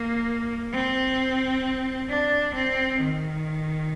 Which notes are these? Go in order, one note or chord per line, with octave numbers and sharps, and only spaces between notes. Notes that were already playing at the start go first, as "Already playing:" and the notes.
Already playing: A#3
C4
D4
C4
D#3